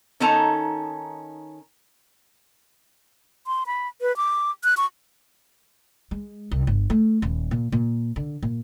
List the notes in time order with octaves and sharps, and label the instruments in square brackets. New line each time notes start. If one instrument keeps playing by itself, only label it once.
[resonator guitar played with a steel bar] D#3 C#4 D#4 A4 A5 A#5
[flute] C6
B5
B4
D6
F#6
C#6
[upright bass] G#3
C2
G1
A3
D#1
A#2
A#2
D3
A#2